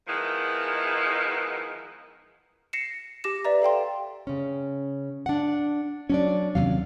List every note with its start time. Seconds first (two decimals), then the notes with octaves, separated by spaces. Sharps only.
0.07 D#3 F3 G#3 B3 E4
2.73 A#6 C7 C#7 E7
3.24 G4 D6 A#6 E7
3.45 B4 D5 E5 A#5
3.62 A4 F5 G5 C6
4.27 C#3 C#4
5.26 D4 F#5
6.10 F#3 C#4 D4 D5
6.55 D#2 C3 F#3 F5